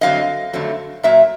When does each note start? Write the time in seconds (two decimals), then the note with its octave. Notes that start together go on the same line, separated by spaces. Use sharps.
0.01 F2 D3 F#3 C4 D#5 F5
0.53 F2 D3 F#3 A3 C4
1.03 A#2 F#3 A#3 E5